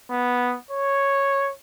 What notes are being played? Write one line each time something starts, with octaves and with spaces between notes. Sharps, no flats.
B3
C#5